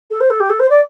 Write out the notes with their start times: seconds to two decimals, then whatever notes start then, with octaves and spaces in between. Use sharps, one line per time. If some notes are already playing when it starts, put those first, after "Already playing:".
0.10 A4
0.20 C5
0.30 A4
0.40 G4
0.49 A4
0.59 C5
0.70 D5